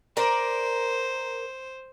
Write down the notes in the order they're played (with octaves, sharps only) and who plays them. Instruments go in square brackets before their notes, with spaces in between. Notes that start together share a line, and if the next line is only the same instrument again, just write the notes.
[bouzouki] A#4 D5 [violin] C5